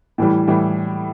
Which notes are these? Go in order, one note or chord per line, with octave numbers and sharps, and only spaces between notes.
A2 E3 G3
A2 E3 G3